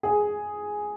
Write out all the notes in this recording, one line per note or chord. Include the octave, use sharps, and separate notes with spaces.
G#4